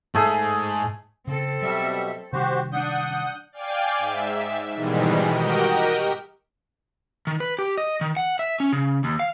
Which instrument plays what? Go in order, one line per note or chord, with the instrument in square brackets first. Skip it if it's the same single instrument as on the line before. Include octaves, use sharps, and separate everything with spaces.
[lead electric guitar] G#2 [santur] A3 G#4
[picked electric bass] C#3 [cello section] C4 A4
[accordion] B2 G3 E5 [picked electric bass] F#3
[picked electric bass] C3 D#3 G3 [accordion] F#4 G4 C5
[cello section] D4 [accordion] F#5 D#6 G6
[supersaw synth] D5 F5 G5 G#5 D6
G#2 E5
G#2 B2 D#3 E3 G3 G#3
F#4 G4 A#4 D#5 G5
[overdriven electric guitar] D#3
B4
G4
D#5
D#3
F#5
E5
C#4
C#3
D#2
F5